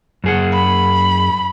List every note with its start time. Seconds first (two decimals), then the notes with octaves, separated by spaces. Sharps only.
0.24 F#2 G#4 F#5
0.53 B5